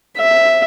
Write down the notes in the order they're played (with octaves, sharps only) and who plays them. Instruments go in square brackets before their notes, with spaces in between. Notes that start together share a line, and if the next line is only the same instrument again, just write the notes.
[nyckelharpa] E5